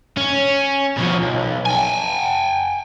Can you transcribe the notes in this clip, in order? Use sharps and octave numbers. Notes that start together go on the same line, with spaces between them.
C#4
B2 F3
B1
G5 G#5